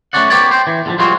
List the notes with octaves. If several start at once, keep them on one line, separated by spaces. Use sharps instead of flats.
A3 B3 C#4 F#4 D5 F#5
B3 G4 C#5 D5
C5 G5
E3
E2 D3 F3
F3 G3 G#3 C4 F4 F#4